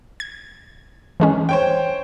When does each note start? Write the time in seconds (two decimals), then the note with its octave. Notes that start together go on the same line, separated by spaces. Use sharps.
0.20 G#6
1.20 E3 G#3 C#4
1.49 C5 C#5 G5